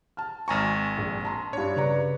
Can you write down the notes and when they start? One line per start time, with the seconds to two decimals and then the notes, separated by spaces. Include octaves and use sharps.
0.17 A5 F6
0.48 G#1 G#5 A#5 C#6 F6
0.98 A#1
1.25 A5 A#5 C6
1.53 G2 D4 C#5
1.76 C#3 B4 D5 A#5